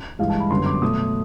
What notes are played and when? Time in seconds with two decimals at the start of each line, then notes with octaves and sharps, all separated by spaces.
0.19 G2 E3 G#3 F5
0.29 A5
0.40 B5
0.50 F#2 D3 G3 B3 C6
0.66 D6
0.82 B2 F#3 A3 D#6